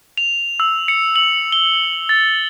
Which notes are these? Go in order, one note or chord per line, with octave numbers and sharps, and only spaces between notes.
F7
E6
C#7
F#7
G7
A6